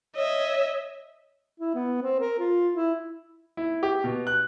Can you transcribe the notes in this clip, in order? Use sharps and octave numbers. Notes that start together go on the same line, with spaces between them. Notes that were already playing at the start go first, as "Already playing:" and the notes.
C#5 D#5 E5
E4
B3
C4
A#4
F4
E4
E4
G4
B2
F#6